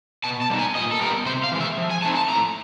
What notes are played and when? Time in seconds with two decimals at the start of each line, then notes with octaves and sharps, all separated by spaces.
0.24 B2 A5
0.42 A5
0.50 G3 B3 D#4
0.59 G#5
0.75 A#2 D#5
0.91 A4
1.01 G3 B3 A#4
1.26 C3 C5
1.43 F5
1.52 E3 G#3
1.60 E5
1.77 F3
1.90 G#5
2.02 A3 C4 D#4 A5
2.15 A5
2.28 A2 A#5